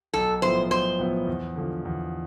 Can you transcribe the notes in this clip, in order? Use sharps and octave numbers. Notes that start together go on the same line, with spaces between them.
B1 A4
A2 F3 B3 E4 C5
B1 C5
A2 F3 B3 E4
E2
D3 F3
E2